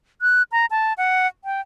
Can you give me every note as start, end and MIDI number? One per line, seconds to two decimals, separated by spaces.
0.22 0.43 90
0.52 0.66 82
0.71 0.93 81
0.98 1.27 78
1.45 1.61 79